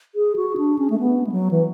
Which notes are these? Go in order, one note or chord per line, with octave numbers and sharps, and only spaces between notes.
G#4
F#4
D4
C#4
A3
B3
G#3
F#3
E3